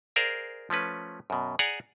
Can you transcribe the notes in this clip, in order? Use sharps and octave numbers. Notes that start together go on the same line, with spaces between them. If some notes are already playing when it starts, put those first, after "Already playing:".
G#4 A#4 C5 D5 F5
F3 A3 C#4 B4
F#2 B2
G#4 D5 F#5 G#5 A#5